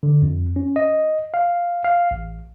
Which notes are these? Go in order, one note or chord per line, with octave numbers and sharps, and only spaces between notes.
D3
F2
C#4
D#5
F5
F5
A1